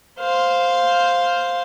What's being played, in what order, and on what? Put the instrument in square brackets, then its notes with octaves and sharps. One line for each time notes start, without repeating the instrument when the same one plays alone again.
[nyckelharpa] C5 F5